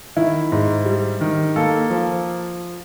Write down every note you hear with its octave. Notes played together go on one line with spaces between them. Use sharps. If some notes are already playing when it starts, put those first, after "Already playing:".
D#3 E4
G#2
G3
D#3
A#3 A4
F3